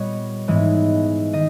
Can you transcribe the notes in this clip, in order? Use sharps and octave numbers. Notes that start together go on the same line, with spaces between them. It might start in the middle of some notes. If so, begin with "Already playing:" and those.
Already playing: A#2 G3 B3 C#5 D#5
G#2 E3 G#3 B3
D#3 D#5